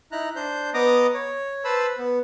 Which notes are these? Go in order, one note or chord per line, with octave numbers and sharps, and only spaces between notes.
D#4 E4 A#5 F#6
D4 C5 G6
B3 D#5 A#5 D6 D#6
C#5
B4 C5 A5 B5 E6
B3